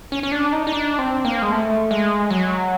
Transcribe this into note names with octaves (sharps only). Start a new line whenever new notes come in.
C#4
C#4
D4
D#4
D#4
D4
C4
A#3
G#3
A3
G#3
F#3